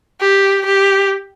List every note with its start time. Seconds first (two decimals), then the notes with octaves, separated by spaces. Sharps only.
0.21 G4
0.66 G4